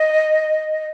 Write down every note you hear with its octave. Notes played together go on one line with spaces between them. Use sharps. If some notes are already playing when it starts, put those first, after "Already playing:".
Already playing: D#5